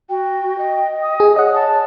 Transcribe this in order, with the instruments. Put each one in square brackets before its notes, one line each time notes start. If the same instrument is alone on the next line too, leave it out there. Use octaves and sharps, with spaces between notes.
[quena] F#4 [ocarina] G5
[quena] D#5
[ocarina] D#6
[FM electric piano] G#4
[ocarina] C#5 [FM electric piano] D#5 F#5
[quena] A5